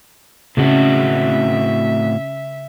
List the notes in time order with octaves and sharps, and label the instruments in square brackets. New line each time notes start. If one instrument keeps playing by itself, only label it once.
[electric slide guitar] A2 C4 F#4 [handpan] C#3 [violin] E5